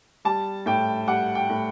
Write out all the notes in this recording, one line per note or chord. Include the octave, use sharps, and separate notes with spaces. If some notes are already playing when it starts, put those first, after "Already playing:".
G3 A5
A2 G5
G3 F#5
G5
A2